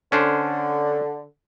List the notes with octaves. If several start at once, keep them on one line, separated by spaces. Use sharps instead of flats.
D3 C#4 D4 C5